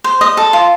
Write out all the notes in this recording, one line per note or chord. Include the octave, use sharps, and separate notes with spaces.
C5
D#5
A4
F4